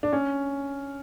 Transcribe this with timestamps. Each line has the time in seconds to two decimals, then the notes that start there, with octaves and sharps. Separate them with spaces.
0.03 D4
0.13 C#4